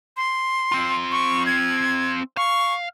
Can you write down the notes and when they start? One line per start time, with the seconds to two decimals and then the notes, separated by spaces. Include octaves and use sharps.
0.17 C6
0.72 C4 F4
1.12 C#6
1.46 G#6
2.37 F5 C#6